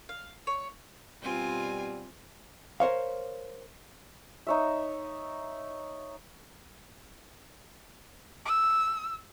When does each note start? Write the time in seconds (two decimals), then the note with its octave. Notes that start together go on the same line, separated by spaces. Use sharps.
0.09 F5
0.47 C#5
1.23 B2 G3 C4 F4 G#5
2.80 A#4 C5 C#5 F5
4.47 D#4 C#5 E5
8.46 E6